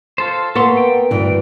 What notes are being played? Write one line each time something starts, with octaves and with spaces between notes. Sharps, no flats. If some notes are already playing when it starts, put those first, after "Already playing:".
F4 A4 C5
A#3 B3 A4 C#5 C6
G5
D2 G2 E3